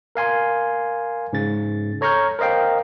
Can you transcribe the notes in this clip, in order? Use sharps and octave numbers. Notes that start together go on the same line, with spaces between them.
A#4 F5 G#5 C6
G#2 C#3 A6
A4 C#5 A#5 C#6 F6 G6
A#4 C5 D#5 F5 G5